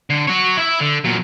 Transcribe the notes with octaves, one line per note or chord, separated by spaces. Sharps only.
D3
F#4 C#5
E4 E5
D3
A#2 F#3